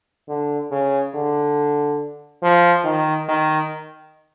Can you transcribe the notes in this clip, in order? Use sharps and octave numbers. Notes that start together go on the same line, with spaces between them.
D3
C#3
D3
F3
D#3
D#3